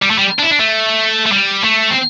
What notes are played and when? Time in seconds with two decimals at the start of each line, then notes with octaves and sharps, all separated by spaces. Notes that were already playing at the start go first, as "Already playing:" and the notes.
0.02 G3
0.10 A3
0.18 G3
0.39 D4
0.42 E4
0.51 D4
0.59 A3
1.26 A3
1.32 G3
1.64 A3
1.90 C4